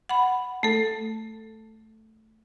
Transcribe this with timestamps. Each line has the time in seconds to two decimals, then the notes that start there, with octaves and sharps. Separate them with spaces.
0.09 F#5 B5
0.63 A3 A4